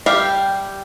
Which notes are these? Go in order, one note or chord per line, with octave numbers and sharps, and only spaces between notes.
G3 G4 E5 F5